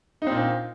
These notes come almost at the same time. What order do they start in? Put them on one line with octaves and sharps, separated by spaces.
D#4 C4 A#2